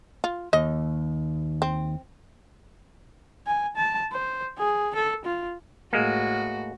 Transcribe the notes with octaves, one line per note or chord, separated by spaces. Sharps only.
F4
D#2 D#5
C4
G#5
A5
C5
G#4
A4
F4
A2 G#3 A#3 F#4